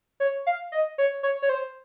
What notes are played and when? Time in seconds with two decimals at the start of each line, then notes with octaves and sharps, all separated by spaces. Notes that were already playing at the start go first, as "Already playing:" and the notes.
0.20 C#5
0.47 F5
0.72 D#5
0.98 C#5
1.23 C#5
1.42 C#5
1.49 C5